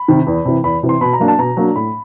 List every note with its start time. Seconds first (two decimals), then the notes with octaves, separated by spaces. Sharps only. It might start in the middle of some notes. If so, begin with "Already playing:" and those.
Already playing: B5
0.08 C3 D#3
0.27 E2
0.45 C3 E3
0.64 E2 B5
0.83 C3 E3
0.89 C6
1.01 B2 B5
1.13 A#5
1.20 F#3 A#3 D4
1.28 A5
1.38 B2 A#5
1.57 F#3 A#3 D4
1.76 A2 B5